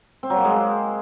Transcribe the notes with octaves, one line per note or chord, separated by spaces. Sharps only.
C4
F#3
A#3
G#3